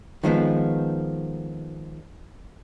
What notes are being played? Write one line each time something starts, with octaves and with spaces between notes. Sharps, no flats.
D#3 F3 G#3 B3